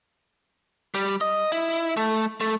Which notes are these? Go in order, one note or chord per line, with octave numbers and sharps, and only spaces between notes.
G3
D#5
E4
A3
A3